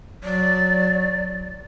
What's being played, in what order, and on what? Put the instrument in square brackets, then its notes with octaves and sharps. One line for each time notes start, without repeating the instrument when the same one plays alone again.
[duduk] F#3 [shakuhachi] D5